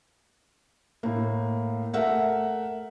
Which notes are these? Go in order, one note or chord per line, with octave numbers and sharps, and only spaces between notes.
A2 A#3
A3 A#4 E5 F#5